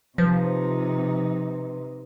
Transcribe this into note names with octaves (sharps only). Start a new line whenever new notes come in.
C3 F3 D#4 B4